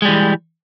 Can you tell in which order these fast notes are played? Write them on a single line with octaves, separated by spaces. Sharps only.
G#3 G3 E3